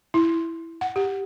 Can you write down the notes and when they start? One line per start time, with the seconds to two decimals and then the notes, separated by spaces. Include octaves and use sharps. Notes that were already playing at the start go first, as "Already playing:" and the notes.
0.14 E4
0.81 F#5
0.96 G4